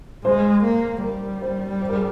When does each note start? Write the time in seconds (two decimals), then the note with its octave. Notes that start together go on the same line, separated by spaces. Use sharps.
0.25 G#3 C5
0.64 A#3
1.03 G3 A#4
1.42 C5
1.81 C5
1.89 A#4
1.96 G#4